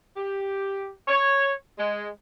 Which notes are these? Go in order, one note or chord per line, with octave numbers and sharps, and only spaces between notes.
G4
C#5
G#3